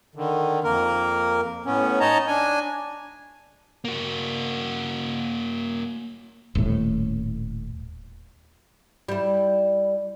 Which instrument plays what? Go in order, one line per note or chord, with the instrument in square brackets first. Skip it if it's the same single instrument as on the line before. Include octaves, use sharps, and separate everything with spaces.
[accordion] D3 D#3
F2 A#3 A#4
A2 B3 C#4
D#4 C#5 D#5 A5 A#5
D4 G#5
[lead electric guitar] A#3 F#4
[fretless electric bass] D#1 A2
[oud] G3 E4